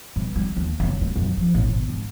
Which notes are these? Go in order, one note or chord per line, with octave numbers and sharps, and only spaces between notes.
G2
G3
D#2
F#1
A3
F#2
F3
A1
G1
G#2